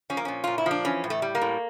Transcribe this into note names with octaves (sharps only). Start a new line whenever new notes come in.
F3 C#4
A#3
A#2 C#4
A#2 F4
E4
F3 D4
E3 C#4
A2
A3
G3
A#3
A2